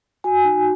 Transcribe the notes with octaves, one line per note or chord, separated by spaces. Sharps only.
F#4 G#5
D#4